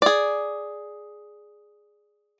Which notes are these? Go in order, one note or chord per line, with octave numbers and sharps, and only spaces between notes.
G#4 D5